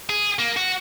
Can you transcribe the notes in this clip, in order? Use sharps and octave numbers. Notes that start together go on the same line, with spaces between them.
G#4
A#3
F#4